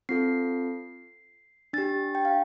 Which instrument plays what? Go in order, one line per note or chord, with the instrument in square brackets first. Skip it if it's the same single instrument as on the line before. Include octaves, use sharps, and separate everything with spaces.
[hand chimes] C4 F4 A4 C7
D4 G4 A6
G5
F5